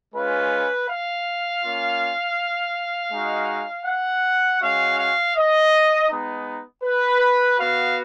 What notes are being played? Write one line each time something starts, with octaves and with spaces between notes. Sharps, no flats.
G#3 C#4 F4 B4
F5
A#3 C#4 F4
G#3 D#4 F#4
F#5
G#3 C#4 F#4 F5
F5
D#5
G#3 B3 D#4
B4
B3 F#4 F5